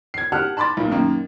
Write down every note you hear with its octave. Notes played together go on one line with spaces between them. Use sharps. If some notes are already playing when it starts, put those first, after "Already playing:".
G#6 C7
G4 F#5 A5 F6 F#6
A5 B5 C6 D6 A6
B1 A#2
F#2 D#3 A#3